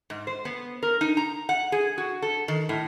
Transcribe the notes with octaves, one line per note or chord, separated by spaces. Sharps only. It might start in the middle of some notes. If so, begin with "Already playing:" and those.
G#2
C5
B3
A#4
D#4
A#5
F#5
G#4
F#4
A4
D#3
A2